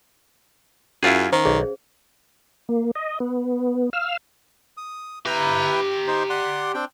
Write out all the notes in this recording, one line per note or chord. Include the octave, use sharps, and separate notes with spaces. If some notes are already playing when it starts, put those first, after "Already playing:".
F#2 C#4 E4 F4 G#4 E5 F5
D#3 C5
B1 G#4
A#3
D#5
B3
F5 E6 F6
D#6
E4 G4 B4 G5 A#5
D#4 C5
D5 F#5 C6
C4 D4 G5